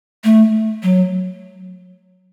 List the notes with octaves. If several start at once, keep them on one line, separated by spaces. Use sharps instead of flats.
A3
F#3